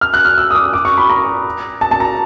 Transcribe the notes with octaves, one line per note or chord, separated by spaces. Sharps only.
F6
F#6
F6
E6
D#6
D6
D6
C#6
B5
A#5
A5
A5
A#5